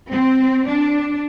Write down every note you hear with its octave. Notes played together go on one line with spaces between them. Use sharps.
C4
D4